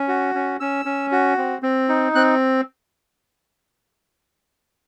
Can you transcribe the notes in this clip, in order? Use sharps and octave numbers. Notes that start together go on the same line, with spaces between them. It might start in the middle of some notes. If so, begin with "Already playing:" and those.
Already playing: C#4
F#4
C#4
C#4 E6
C#4
F#4
C4
C4
D#4
C4 F#6